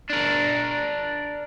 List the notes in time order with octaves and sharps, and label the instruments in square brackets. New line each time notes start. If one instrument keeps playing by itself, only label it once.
[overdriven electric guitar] D4 A#4